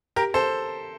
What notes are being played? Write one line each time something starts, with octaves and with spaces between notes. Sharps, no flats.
G4 A#4
A4 C5